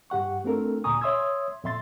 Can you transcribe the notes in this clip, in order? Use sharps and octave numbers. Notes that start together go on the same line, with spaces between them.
G2 G4 F#5 C#6
A3 C4 D4 F4 A4 A#4
D2 A#2 G#5 A#5 C#6 D#6
C#5 E5 C6 D#6 E6 G#6
F2 A#2 E5 C6 A6